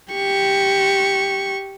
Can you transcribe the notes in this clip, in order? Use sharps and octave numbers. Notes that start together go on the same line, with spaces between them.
G4 C#6